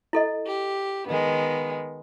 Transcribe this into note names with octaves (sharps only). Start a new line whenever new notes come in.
E4 A4 D#5
G4
D#3 G#3 B3